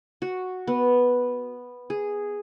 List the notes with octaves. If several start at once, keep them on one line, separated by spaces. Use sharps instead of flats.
F#4
B3
G#4